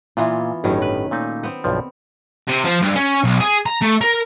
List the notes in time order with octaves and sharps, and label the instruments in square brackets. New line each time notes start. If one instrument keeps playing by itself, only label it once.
[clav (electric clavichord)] A#2 [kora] E3 B3 F4
[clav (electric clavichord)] G1 A2 [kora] D#3 F#3 C#4
[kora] B4
[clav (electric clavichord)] A#2 A3 D#4
[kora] B3 C4
[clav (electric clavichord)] B1 G2 F3
[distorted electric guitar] C3
F3
G2
C#4
B1
G#4
A#5
A3
A#4